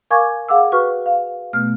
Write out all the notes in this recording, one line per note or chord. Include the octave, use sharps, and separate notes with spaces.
A#4 F5 G#5 C#6 D6 G#6
G#4 F5 F#5 D6 E6
F#4 B4 C#6 F6
F5
B2 A3 B3 F6